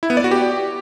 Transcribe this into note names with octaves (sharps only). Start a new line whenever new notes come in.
E4
B3
D5
F#4
G4